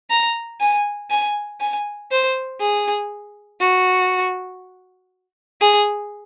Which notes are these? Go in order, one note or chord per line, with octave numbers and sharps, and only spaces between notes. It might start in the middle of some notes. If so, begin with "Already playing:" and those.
A#5
G#5
G#5
G#5
C5
G#4
F#4
G#4